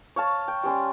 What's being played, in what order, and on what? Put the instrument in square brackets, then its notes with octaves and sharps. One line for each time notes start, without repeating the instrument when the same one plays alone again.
[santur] C#5 F5 A5
G5
G3 C#4 C6